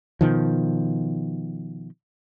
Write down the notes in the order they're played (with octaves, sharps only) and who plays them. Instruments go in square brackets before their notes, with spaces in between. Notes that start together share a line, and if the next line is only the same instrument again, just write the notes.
[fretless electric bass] B2 D#3 F3